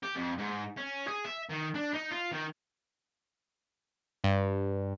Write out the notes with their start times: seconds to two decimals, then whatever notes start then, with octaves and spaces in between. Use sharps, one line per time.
0.03 G4
0.16 F2
0.38 G#2
0.77 C#4
1.07 G#4
1.24 E5
1.49 D#3
1.74 D4
1.93 D#4
2.10 F4
2.32 D#3
4.24 G2